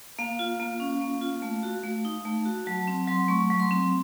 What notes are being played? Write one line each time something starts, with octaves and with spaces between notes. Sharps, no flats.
A#3 F5
F4
A#3
C#4
A#3
F4
A3
F#4
A3
D#4
A3
F#4
F#3 A5
C4
F#3 C6
A3 C#6
F#3
C6
C4